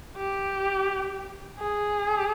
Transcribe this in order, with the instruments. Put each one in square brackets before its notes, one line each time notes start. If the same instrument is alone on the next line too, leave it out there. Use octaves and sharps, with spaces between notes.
[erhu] G4
G#4